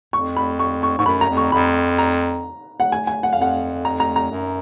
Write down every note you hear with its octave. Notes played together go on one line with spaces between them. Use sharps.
F2 C#6
B5
C#6
C#6
G#2 C#6
F#2 B5
A#5
F2
C#6
F2 B5
A#5
F#5
G#5
G#5
F#5
F5
F2 F#5
A#5
A#5
A#5
F#2